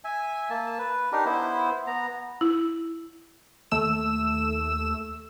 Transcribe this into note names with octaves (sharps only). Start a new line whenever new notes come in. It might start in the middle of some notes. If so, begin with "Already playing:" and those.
E5 G#5
A#3 A5
B4
D4 D#4 G4 A#4
B3 E4 C5
B3 A#5
E4
D#2 A3 E6 E7